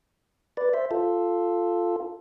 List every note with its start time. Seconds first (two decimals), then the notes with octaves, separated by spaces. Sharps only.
0.57 B4 D5
0.73 C5 E5
0.91 F4 A4